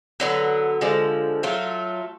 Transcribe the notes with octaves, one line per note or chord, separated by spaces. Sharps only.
D3 F#3 B3
D3 F3 G#3
F#3 A3 F4